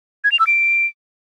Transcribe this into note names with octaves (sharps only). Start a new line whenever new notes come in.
G#6
F7
E6
D7